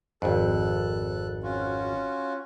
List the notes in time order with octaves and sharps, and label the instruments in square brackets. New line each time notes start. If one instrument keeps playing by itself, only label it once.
[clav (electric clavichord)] G#1 F2 [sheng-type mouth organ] A4 F#6
[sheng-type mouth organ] C#4 F4 F#4